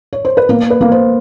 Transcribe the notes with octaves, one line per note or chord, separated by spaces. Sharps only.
C#5
C5
B4
A#3 A#4
B4
A#3
C5